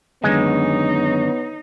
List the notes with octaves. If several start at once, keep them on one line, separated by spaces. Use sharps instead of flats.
F#2 D3 D#3 G#3 B3 D#4 C#5